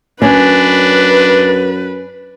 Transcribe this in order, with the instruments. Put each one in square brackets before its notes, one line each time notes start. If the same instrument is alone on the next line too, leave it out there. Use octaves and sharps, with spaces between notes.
[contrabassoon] F#2 [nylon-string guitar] C#4 [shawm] D4 [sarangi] B4